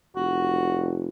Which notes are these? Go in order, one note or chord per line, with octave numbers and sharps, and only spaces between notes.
F1 F#4